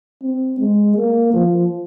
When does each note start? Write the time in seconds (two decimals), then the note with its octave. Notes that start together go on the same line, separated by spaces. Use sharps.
0.23 C4
0.59 G#3
0.96 A#3
1.33 F3